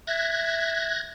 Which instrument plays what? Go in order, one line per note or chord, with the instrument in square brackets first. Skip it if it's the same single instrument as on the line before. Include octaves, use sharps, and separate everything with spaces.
[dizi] E5 [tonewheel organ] F#6 G#6 A#6